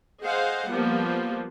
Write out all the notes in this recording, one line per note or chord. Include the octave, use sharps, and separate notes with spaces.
G#4 C5 D#5 F5 F#5
F3 G3 A#3 B3